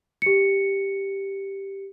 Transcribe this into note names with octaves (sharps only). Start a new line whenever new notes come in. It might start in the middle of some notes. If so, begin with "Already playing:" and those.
G4 C#7